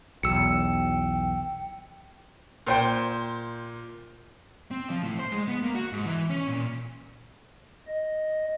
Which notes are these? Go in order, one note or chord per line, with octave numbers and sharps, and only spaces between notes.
B1 E2 G5 E6 C#7
A#2 C5 G5
C4
F3
A2
C5
G#3
B3
A#3
F#4
G#2
E3
C#4
A#2
D#5